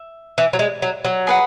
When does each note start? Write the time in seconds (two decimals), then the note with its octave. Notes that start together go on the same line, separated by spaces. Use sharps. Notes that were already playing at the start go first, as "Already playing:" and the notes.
Already playing: E5
0.38 E3
0.53 F#3
0.59 G#3
0.82 F#3
1.05 F#3
1.27 G#4 B4 F#5